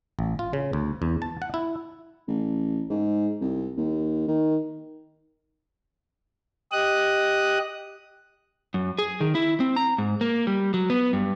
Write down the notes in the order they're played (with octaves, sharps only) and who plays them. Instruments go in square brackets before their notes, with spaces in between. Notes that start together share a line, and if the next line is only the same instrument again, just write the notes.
[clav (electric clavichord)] A1
F4
C#3
D2
E2
A5
F#5
E4
[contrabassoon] A1
G#2
C2
D#2
D#3
[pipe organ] G4 D#5 D#6 F#6
[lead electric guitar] F#2
G#4
D#3
E4
C4
A#5
G#2
A#3
G3
F#3
B3
G2